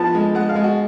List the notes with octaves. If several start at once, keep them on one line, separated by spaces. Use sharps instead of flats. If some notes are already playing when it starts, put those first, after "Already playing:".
Already playing: F3 B3 A5
G#3
G#3 F#5
F5
G#3
F#4